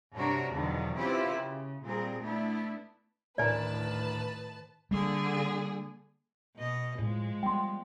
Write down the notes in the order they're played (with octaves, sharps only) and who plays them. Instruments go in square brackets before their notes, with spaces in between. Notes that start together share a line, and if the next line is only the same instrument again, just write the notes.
[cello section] G2 C3 D4 F#4 A#4 C#5
E2 B2 D3 D#3 F3 F#3
C4 C#4 E4 F4 G4 B4
C#3
A#2 G3 C4 G#4 A#4
A3 B3 D4 E4
[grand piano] D1 A#4 [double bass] A2 D#3 [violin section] B4 A5 [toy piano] D5 G#5
[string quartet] D3 G#4 [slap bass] G3 A#3
[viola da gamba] B2 D#5
[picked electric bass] A2 [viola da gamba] F3 G#3
[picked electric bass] G3 B3 [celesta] G5 C6